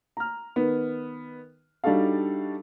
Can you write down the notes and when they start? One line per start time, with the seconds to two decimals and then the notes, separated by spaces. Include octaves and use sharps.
0.17 A#5 F6
0.56 D#3 B3
1.84 G3 D4 D#4 F#4 A4 F5